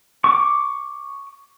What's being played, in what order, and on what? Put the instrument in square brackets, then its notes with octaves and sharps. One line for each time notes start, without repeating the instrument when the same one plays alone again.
[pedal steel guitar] C#6 D6